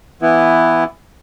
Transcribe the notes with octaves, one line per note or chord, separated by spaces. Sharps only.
E3 B3 E4